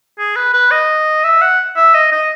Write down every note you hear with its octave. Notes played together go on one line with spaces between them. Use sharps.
G#4
B4
B4
D#5
E5
F#5
E5
D#5
D#5